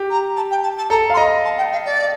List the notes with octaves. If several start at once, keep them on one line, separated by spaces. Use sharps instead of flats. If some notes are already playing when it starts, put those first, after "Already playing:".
Already playing: G4
A#5
A5
G5
A5
A5
A4 A#5
F5
C6
D#5 A#5
A5
G5
F5
D5